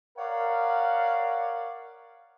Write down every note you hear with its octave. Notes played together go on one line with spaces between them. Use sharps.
A#4 C#5 D5 F5 F#5